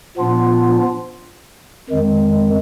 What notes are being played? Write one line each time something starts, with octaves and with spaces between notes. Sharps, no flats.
A#2 F3 B3 D4 F4
F2 D#3 G#3